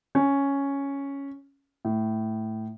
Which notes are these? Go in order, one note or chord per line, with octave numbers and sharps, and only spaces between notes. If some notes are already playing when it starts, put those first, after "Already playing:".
C#4
A2